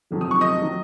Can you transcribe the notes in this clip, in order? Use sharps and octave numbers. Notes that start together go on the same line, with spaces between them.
F1 F2 D#3 F#3
D#6
C#6
D#5 D#6
D#3 F#3